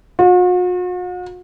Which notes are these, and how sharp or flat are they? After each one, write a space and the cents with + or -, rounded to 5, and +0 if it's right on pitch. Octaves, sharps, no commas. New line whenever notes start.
F#4 -45